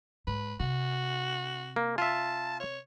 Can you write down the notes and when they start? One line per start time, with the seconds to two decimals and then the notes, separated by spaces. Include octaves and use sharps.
0.27 G#2 B4
0.60 C3 F#4
1.76 A#3
1.98 F4 E5 A5
2.60 C#5